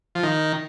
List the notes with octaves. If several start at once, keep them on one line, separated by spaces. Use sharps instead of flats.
F3
D#3